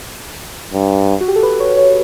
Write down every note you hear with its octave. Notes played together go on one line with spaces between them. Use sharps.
G2
F#4
G4
A4
B4
C#5
C#5